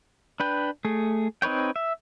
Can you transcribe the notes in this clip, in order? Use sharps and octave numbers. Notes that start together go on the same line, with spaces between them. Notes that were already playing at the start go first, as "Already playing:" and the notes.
D4 B4 G5
A3 G#4
C4 D#4 B4 C#5 G5
E5